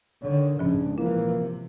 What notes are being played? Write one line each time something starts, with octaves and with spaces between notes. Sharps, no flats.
D3 D#3 C#5
A1 G#2 C#3 F3 C#4 D4
A#2 E3 F3 A#3 E4
C3